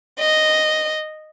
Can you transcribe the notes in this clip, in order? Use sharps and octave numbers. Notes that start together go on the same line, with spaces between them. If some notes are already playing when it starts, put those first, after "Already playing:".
D#5